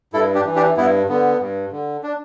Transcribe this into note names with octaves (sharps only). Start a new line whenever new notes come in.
G2 E4 A4
D4 G4
E3
D4 G4
G2 B3 E4
D3 B3
G2
D3
D4